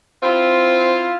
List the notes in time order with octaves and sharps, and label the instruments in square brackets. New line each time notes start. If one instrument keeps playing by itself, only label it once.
[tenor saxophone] C4 [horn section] E4 F4